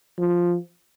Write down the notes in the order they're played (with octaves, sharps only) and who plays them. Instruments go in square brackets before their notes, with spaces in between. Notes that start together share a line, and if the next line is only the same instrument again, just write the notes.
[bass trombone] F3